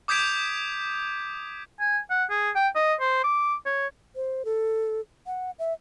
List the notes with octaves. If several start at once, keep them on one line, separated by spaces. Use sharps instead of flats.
D6 D#6 G6 G#6 B6 D7
G#5
F#5
G#4
G5
D#5
C5
D6
C#5
C5
A4
F#5
E5